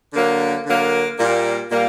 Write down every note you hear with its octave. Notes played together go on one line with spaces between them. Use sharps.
D3 F#3 A#3
D3 F#3 A#3
A#2 G3 A#3
A#2 G3 A#3